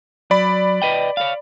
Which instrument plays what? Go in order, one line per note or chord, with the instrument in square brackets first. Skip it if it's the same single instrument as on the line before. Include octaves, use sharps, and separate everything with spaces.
[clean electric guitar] F#3 [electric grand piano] D5 B5
[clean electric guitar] B4 D#5 G5
C#5 F5